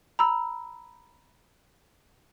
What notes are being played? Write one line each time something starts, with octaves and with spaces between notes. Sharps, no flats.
A#5 B5 E6